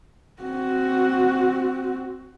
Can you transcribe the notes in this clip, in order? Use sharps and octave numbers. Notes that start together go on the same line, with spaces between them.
C4 F#4